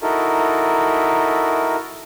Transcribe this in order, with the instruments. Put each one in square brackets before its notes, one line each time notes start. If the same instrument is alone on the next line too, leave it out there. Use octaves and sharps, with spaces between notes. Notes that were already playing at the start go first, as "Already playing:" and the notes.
[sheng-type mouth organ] D#4 E4 F#4 A4 A#4